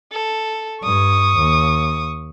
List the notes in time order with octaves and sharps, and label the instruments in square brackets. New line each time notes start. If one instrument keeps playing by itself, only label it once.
[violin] A4
[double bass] G2 [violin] C#6 D#6
[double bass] D#2